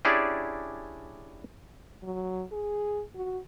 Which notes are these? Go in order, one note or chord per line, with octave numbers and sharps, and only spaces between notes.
C#4 D4 E4 G4 G#4 D5
F#3
G#4
F#4